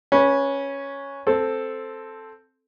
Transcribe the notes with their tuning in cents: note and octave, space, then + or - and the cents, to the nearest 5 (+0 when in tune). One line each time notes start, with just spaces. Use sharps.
C#4 +0 B4 -20
C4 +0 A4 +0